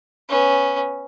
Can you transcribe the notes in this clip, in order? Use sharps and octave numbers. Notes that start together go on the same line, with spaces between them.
B3 C#4